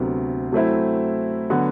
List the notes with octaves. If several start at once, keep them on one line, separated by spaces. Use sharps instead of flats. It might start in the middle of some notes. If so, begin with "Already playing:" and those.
Already playing: D2 C3 F#3 B3
F#3 A3 C4 E4
D3 F#3 B3 F#4